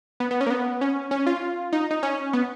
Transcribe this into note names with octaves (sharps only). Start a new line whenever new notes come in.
B3
B3
C#4
A#3
B3
C#4
C#4
F4
D#4
D#4
C#4
B3